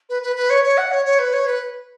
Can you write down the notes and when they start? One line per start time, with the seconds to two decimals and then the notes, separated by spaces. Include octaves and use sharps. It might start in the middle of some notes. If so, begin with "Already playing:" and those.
0.09 B4
0.22 B4
0.36 B4
0.50 C#5
0.64 C#5
0.78 F#5
0.91 C#5
1.05 C#5
1.19 B4
1.33 C#5
1.47 B4